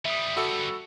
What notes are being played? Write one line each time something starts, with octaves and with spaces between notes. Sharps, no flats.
G3 B3 E5 D#6
F#4 A4 B5 E6 C#7